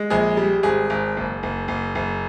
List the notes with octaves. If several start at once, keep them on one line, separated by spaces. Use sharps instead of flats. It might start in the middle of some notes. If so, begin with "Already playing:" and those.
Already playing: G#3
A#1 G#4
G3
G#1 G#4
G#1
F#1
F#1
F#1
F#1